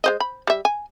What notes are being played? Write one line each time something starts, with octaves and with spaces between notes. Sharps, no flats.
G#3 C5 D#5
B5
G3 E5
G#5